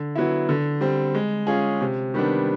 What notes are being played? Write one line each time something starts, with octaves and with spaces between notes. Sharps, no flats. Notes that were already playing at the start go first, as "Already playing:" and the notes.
Already playing: D3
F#3 B3 E4
D3
G3 C4
G#3
C#4 F4 G#4
C3
D#3 G3 B3 D4